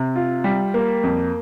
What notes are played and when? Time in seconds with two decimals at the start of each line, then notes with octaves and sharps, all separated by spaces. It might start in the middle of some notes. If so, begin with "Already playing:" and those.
Already playing: C3
0.16 F4
0.44 G3
0.74 A#3
1.03 F2